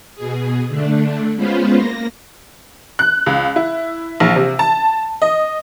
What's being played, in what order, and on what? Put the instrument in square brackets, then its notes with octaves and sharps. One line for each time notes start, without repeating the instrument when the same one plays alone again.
[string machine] B2 G#4
D3 A3 D4
G#3 B3 C#4 F4 B4 C5
A#3 A#6
[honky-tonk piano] F#6
C#2
E4
A#1
C3
A5
D#5